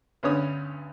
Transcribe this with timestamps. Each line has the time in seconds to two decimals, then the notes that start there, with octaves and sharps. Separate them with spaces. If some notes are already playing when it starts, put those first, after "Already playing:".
0.23 D2 G2 B3 C#4 C#5 D#6